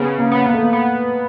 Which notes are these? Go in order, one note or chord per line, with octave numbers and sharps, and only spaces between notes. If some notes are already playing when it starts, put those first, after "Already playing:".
Already playing: C#3 B3
A#3
B3
A#3
A3
A#3
B3